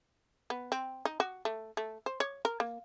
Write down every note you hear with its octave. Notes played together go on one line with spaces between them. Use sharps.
B3
C4
D#4
F#4
A3
A3
C5
C#5
A#4
A#3